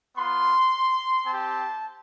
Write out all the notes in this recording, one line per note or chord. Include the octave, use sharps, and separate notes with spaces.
B3 F4 C6
C4 G4 A5